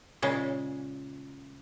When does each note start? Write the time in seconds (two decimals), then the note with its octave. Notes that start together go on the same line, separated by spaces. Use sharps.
0.22 A#2 C#3 G#3